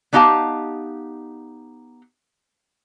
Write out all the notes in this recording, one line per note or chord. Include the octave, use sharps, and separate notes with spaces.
B3 D4 D#4 G4 F5 A5